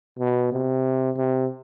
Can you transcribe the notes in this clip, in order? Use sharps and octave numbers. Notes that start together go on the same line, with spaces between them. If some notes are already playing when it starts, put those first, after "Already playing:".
B2
C3
C3